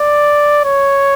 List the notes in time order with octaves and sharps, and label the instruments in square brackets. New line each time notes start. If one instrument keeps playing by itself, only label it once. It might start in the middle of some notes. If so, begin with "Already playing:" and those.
Already playing: [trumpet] D5
C#5